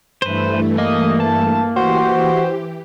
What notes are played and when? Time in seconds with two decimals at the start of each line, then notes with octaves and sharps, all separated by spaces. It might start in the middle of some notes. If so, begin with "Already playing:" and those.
0.22 G2 E3 A3 B4 C5
0.78 A#3 D#5
1.20 A5
1.76 E3 F#4 G4 C5